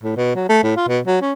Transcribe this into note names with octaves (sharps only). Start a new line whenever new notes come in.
A2
B2
F#3
A3
A2
F4
B2
F#3
C#4